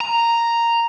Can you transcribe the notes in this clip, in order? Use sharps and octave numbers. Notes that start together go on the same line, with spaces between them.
A#5